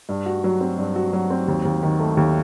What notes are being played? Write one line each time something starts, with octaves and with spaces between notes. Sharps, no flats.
G2
F#4
F#3
C4
G2
F#4
F#3
C4
D#2
D#2
D#3
A3
D#2